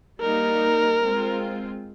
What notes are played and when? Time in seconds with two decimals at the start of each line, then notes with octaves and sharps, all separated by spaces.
0.20 G3 A#3 D#4 A#4
1.01 G#3 C4 F4